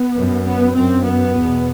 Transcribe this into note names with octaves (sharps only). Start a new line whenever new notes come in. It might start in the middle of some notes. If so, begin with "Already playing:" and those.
Already playing: B3
F#2
B3
F#2 C4
B3
E2 B2